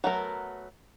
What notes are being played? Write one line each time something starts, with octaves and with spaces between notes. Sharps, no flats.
F#3 A3 B3 A#4